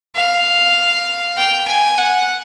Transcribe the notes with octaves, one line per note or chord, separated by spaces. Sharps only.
F5
G5
G#5
F#5